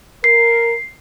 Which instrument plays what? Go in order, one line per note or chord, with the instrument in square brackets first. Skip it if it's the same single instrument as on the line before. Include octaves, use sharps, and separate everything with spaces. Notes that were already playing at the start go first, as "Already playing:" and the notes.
[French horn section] A#4 [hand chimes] C7